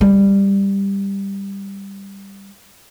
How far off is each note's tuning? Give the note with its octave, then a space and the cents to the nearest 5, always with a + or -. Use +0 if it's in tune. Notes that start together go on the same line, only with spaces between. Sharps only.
G3 +10